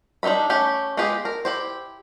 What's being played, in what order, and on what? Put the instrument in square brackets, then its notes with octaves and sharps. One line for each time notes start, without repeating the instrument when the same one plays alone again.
[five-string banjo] G3 D4 D#4 E5 B5
A3 C#4 G4
G#3 B3 F4 G4 G#4
A#4
E4 G4 C5